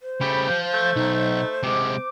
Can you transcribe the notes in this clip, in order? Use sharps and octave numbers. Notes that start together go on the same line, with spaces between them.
C5
C#3 A3 G4 B5
F3 G6
A3 G6
B1 D#4
C3 G#3 D6